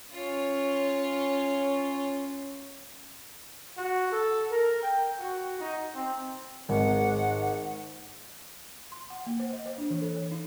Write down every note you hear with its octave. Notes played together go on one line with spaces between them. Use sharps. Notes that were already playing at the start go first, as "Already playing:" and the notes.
C#4 F4 C#5
F#4
A4
A#4
G5
F#4
D#4
C4
G#1 G#2 F#5
C6
F#5
A#3
C5
D#5
C5
D4
E3
A4
C#5
D#4